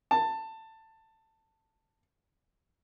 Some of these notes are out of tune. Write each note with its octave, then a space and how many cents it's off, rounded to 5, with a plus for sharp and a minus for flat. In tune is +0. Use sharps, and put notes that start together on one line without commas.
A5 +15